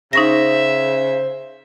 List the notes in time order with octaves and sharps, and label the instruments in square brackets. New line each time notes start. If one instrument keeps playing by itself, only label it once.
[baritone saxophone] C#3 [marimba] D#4 C#6 A#6 [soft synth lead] C5 [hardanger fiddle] E5